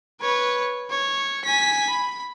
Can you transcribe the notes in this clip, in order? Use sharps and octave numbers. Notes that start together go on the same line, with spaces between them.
B4 C#5
C#5
G#5 B6
B5